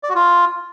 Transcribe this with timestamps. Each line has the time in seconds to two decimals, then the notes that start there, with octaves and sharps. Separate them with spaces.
0.03 D5
0.09 F#4
0.15 F4